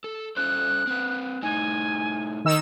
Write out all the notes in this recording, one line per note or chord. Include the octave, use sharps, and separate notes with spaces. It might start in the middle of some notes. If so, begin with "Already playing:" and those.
A4
C#4 A4 C5 F#6
C4 B4
A2 D#4 G#5
D#3 D#4 E6